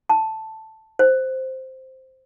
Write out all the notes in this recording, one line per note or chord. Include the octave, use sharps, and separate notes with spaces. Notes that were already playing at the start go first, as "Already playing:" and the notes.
A5
C5